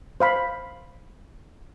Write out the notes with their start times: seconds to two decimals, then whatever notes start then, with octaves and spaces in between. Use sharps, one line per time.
0.20 C5 F5 B5